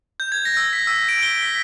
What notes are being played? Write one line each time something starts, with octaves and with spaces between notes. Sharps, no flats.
G6
G#6
A#6
E6
B6
E6
D7
G7
B6